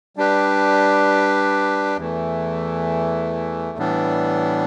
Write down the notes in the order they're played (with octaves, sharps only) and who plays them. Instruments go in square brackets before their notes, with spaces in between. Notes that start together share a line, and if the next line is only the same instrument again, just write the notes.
[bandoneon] G3 D4 G4 B4
E2 E3 A3
A2 E3 G3 B3 D4